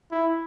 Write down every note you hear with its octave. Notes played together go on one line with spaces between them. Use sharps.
E4